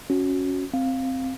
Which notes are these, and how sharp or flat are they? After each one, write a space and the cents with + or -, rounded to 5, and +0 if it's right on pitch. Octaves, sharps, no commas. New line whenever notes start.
C#4 +0 F#4 -10
C4 +0 F5 +0